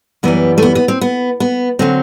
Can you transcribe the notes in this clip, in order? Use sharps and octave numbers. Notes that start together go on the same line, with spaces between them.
F#2 E3 G3 B3
A3
B3
B3
C4
B3
B3
D3 F#3 C4